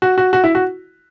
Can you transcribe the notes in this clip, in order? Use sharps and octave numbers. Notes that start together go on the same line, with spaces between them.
F#4
F#4
F#4
E4
F#4